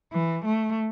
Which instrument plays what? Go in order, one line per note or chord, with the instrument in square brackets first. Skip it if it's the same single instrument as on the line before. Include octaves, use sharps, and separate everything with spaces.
[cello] E3
A3